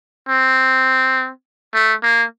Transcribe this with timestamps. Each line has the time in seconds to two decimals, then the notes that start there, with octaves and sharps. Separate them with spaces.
0.29 C4
1.74 A3
2.03 A#3